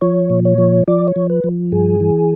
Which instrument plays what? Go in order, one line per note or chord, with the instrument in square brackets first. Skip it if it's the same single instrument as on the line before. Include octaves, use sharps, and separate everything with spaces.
[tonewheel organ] F3 C#5
A#2
C#5
F3
F3 D5
C#5
F3
B4
F3
G2 G#4
E3